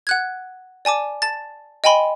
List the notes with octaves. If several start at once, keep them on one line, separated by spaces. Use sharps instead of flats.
F#5 F#6 G#6
D5 G#5 A5 D6
A5 A6
D#5 G5 G#5 B5 C6